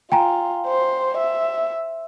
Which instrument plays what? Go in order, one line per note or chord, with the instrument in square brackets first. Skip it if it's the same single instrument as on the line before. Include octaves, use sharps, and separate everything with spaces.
[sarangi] F4 [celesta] G5 G#5 A#5
[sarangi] C5
E5